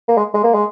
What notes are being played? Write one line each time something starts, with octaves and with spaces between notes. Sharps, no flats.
A#3
G#3
G#3
A#3
G#3